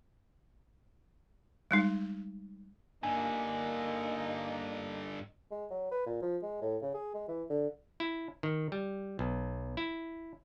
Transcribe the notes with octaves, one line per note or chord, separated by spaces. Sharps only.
G3 G#3 D#4
G2 D3 A#3 D#4 G#5
G#3
F#3
B4
A#2
F3
G#3
A2
C#3
G#4
G#3
E3
D3
E4
D#3
G3
B1
E4